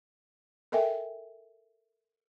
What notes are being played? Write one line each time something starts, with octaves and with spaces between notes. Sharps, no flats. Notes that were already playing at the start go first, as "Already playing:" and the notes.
A4 A#4 D#5 E5 G5 G#5